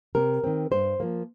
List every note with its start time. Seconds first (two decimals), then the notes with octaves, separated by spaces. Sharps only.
0.15 C3 A#4
0.44 D#3 C4
0.71 G2 C5
1.00 F3 A#3